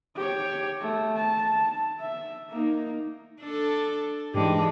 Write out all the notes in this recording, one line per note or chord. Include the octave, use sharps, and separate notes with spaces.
G4 C#5
A3
A5
A5
E5
A#3 D#4
D4 A4
G#2 E3 G#3 D4 G4